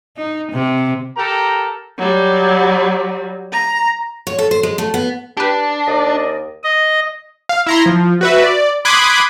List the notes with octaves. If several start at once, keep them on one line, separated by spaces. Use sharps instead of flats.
D#4
C3
G4 A4 A#4 A#5
F#3 G3
A#5
C#5
A4
C5
G#3
A3
B3
D4 G4 B4
D#2 D5 D#5
D#5
F5
E4 A#5 C6
F3
F#4 B4 E5
D5
B5 C6 D6 D#6 F#6 G#6